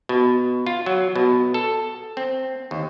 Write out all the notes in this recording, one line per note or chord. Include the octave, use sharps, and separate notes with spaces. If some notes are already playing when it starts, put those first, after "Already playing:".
B2
F4
F#3
B2
A4
C4
D#2